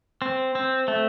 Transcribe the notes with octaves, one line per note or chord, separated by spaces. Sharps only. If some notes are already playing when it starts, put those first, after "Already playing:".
C4
C4
A3